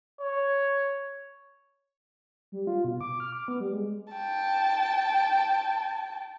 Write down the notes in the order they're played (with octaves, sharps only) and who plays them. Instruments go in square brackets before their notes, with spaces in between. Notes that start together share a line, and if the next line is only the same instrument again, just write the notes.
[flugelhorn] C#5
[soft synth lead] G3
F4
B2
D6
F6
D6
B3
G3
G#3
[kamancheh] G5 A5